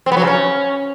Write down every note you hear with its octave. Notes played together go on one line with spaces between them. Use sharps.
C4
B3
F#3
C#3
C#4